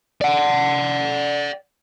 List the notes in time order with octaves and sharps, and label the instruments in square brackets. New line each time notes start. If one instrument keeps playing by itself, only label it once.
[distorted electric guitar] D5 F#5